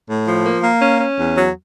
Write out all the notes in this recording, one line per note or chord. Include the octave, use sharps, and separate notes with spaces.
A2
F3
A#3
A#3
C#4
C#4
E2
F#3